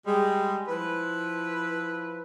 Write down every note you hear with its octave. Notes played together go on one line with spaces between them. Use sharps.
G3 G#3
F3 E4 B4